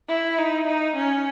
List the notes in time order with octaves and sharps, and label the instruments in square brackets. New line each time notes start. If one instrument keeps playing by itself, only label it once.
[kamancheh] E4
D#4
D#4
C#4